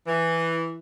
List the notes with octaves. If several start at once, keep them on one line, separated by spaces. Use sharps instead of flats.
E3